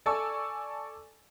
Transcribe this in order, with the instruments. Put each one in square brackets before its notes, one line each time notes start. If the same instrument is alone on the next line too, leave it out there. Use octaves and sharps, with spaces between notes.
[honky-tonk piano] A4 D5 G#5 A5 C#6 E6